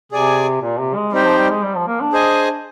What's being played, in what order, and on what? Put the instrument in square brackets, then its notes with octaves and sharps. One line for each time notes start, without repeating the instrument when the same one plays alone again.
[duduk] C3 [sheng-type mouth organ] G#4 D5 G#5
[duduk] A#2
C3
G#3
[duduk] G3 [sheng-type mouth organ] C4 D#4 G4 C5 G5
[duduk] F3
G3
G#3
G3
F3
A#3
D4
[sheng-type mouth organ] G#4 C5 D#5 G#5